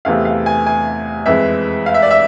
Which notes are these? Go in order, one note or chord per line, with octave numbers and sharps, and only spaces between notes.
E2 C3 E3 A3 C4 F5
F5
G#5
G#5
F2 E3 G#3 E5
F5
E5
D5
E5